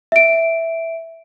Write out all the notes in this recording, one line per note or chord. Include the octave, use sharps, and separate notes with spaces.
E5 D7